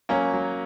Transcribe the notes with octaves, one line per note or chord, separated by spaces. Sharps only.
F#3 A#3 C#4
F#3